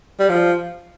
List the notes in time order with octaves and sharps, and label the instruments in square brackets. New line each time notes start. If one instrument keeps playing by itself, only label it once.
[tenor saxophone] G3
F3